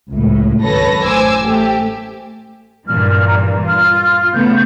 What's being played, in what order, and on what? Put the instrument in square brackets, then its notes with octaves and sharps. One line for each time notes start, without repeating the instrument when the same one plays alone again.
[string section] C#2 A2
G#1 F#2 A4 B4 C#5 A#6
A1 C5 G#5 D6 E6
A3 G4
[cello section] G2 A#2 E3 [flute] F6
[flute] A#5
[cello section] F4 [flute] F6
[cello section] C#3 A3 B3 [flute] G6